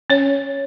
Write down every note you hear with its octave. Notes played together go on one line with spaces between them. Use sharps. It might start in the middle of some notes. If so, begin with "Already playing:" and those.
C#4 C#5